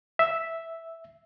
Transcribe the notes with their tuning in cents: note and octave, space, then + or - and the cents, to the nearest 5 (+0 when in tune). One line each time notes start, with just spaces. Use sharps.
E5 -5